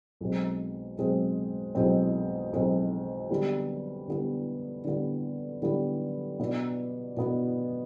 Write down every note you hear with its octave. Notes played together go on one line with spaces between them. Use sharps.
B1 B2 G#3 C4
B1 B2 G#3 C4
B1 B2 G#3 C4
B1 B2 G#3 C4
D3 G3 B3
D3 G3 B3
D3 G3 B3
D3 G3 B3
B2 B3 D4
B2 B3 D4